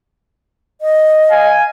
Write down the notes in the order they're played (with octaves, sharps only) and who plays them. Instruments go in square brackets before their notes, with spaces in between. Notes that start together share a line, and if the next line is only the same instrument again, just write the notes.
[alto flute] D#5
[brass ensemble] F5 G#5